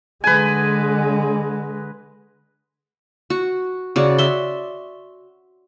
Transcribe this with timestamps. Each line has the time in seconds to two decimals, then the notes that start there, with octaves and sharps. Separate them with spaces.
0.24 D3 G#3 B4 G#5
3.30 F#4
3.96 C#3 F#4 D5
4.18 E5 C6